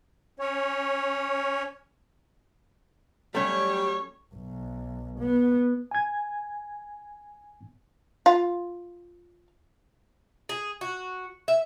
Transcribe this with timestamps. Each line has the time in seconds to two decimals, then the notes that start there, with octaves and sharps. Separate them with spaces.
0.39 C#4 C#5
3.35 F#3 G3 A3 C#4 C#5
4.34 B1
5.19 B3
5.91 G#5 G#6
8.26 F4
10.49 G#4
10.81 F#4
11.48 E5